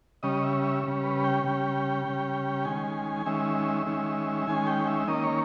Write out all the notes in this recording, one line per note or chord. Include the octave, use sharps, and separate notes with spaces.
C#3 G3 C#4 D#5
E5
E5
C#3 G3 C#4
B4
G5
C#3 G3 C#4
C#3 G3 C#4
D#3 G#3 C#4 G#5
D#3 G#3 C#4 E5
D#3 G#3 C#4
D#3 G#3 C#4 G#5
G5
E5
D#3 A#3 C#4 D#5
C#5